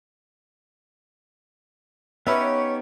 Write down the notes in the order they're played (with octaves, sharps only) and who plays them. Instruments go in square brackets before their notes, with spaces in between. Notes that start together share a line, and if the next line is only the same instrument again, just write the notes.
[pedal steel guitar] B3 D#4 G4 [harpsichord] C#4 [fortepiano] B4 E5 [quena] C#5